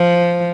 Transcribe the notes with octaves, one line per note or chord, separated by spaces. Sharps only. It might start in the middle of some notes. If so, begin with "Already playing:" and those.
Already playing: F3